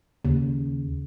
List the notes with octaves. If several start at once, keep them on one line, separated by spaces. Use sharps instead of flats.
D#2 C#3